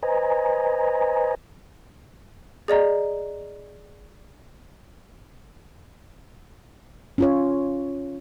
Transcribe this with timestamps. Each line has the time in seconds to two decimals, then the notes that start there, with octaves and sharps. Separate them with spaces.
0.03 B4 C5 D#5 G#5 A#5
2.68 G#4 D5 D#5 A#5
7.18 C#4 F4 C#5